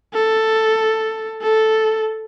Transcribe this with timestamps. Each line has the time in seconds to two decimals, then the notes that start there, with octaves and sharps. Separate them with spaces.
0.14 A4
1.42 A4